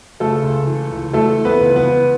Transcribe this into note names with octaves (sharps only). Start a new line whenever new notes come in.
C#3 A3 A4
C#2
E3
C#2
E3 A3 A4
E3
B3 B4
C#2
B3 B4
E3